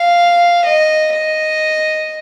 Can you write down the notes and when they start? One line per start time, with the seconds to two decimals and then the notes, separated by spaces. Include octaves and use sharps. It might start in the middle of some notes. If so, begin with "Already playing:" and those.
Already playing: F5
0.65 D#5
1.13 D#5